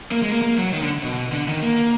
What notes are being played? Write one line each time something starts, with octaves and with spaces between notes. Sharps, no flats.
A#3
G#3
A#3
A#3
F#3
D#3
D3
B2
D3
D#3
A#3